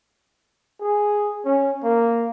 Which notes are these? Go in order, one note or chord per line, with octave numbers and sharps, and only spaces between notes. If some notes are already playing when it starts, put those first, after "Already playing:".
G#4
C#4
A#3